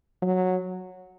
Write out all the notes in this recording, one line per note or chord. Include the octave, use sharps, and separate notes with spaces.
F#3